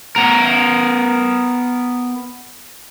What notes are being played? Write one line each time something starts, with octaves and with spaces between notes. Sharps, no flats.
B3 A#4